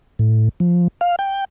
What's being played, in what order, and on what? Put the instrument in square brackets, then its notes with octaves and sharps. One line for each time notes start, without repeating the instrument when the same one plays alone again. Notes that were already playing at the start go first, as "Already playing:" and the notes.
[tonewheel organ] A2
F3
F5
G5